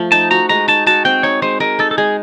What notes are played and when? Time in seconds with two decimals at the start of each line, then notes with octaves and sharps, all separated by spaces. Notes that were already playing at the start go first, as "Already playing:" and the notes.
Already playing: F3 A3
0.12 D#4 A5
0.31 F#4 A#5
0.49 G#3 A#5
0.68 D#4 A5
0.86 F#4 A5
1.05 C4 G5
1.23 D#4 C#5
1.42 G#3 C5
1.60 G#3 A#4
1.79 D#4 A4
1.91 A4
1.98 G#3 G#4